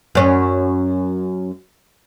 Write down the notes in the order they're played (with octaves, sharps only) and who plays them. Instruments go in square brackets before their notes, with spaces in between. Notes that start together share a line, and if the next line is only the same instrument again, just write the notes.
[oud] F#2 C#4